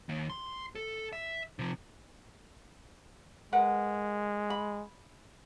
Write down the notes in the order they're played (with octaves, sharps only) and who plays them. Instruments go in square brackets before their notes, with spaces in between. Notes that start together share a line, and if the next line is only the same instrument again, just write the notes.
[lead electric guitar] D#3 A#3
C6
A4
E5
C3 F3
[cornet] G#3 [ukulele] A#4 B4 F#5
[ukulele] B5